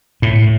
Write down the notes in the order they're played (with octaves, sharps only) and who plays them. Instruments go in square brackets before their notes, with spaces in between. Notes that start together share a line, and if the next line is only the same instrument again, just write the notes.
[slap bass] A2